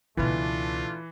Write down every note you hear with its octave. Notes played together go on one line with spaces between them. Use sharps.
C#2 B2 E3 A3 D4 F4 B4